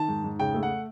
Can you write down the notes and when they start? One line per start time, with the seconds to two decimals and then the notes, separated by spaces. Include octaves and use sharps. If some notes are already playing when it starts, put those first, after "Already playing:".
Already playing: D#3 A5
0.08 G#2
0.24 G#2
0.39 C#3 G5
0.54 A3
0.63 F#5